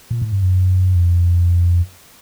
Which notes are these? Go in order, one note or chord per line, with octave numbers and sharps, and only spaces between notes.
A#2
A2
G2
F#2
F2